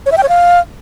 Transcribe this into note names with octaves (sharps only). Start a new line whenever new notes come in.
C#5
E5
G5
C#5
F5